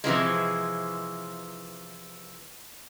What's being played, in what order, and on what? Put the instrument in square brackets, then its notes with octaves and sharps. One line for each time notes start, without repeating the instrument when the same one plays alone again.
[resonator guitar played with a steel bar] C3 E3 F3 G#3